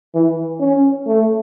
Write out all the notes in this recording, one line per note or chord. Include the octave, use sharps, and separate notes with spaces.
E3
C#4
A3